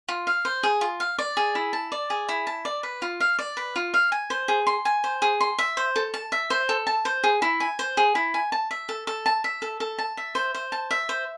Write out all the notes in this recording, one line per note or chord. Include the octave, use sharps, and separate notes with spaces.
F4
F5
C5
G#4
F4
F5
D5
G#4
E4
A5
D5
G#4
E4
A5
D5
B4
F4
F5
D5
B4
F4
F5
G#5
C5
G#4
C6
G#5
C5
G#4
C6
E5
C5
A4
A5
E5
C5
A4
A5
C5
G#4
E4
G#5
C5
G#4
E4
G#5
A5
E5
A4
A4
A5
E5
A4
A4
A5
E5
C5
C5
A5
E5
C5